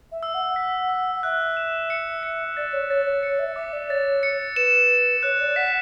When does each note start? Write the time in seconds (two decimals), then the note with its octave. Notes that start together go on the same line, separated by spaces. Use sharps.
0.12 E5
0.23 E6
0.34 F#5
0.56 B6
0.89 E6
1.14 F#5
1.23 E5 F#6
1.57 E7
1.90 C#7
2.23 C#7
2.57 D5 A6
2.73 C#5
2.89 C#5 A6
3.06 C#5
3.23 C#5 C#7
3.39 E5
3.56 E5 D6
3.73 D5
3.90 C#5 A6
4.23 C#7
4.56 B4 E7
4.90 E7
5.23 C#5 F#6
5.40 D5
5.56 F#5 B6